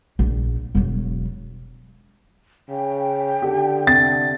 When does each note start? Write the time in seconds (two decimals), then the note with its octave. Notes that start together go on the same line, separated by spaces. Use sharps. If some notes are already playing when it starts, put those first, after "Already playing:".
0.19 A#1
0.75 E1 F#3
2.69 C#3 G5
3.42 D3 G4 A4
3.87 C3 A6